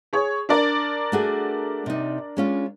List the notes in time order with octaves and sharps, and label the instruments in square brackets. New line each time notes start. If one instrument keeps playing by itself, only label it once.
[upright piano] G#4 C#5
D4 A#4 D5
[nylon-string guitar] A3 F#4 G#4
C3 D#4
G#3 C#4 F4